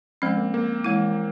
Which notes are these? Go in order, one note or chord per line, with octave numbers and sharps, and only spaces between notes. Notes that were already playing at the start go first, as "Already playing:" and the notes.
F3 G#3 C4 C#4
A#3
A#3
E3 G#3 E4